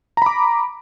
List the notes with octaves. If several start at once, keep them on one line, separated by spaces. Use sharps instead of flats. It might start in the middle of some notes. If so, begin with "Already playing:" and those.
A#5 B5 D6